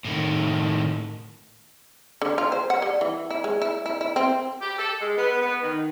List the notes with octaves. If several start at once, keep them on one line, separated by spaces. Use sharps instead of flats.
A2 D#3
D3
F4
C5
F#5
G3
E3
E4
G#3
E4
E4
E4
C4
G4
A4
G#3
B3
B3
D#3